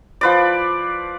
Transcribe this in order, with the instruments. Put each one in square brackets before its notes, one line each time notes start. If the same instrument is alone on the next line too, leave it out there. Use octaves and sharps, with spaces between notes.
[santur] F3 B4 D5